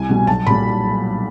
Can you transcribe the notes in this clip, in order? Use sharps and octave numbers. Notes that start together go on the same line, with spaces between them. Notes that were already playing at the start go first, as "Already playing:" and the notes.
Already playing: C2 G#5
B2 G3
B1 A5
A#2 G3 B5